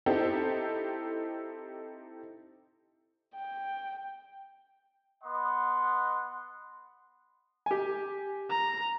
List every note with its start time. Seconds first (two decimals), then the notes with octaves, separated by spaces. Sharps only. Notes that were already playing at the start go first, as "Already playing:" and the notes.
0.06 C4 D#4 E4 G4 A4
3.35 G5
5.23 B3 D#5 F#5 C6
7.66 G4 G#5
8.49 A#5